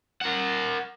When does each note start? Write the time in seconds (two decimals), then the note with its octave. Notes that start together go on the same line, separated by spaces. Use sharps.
0.21 A#4 F#5